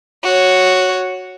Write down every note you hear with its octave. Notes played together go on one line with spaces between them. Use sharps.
F#4 C#5